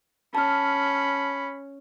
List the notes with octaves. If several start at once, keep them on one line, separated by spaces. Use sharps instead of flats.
C#4 A5 B5 F6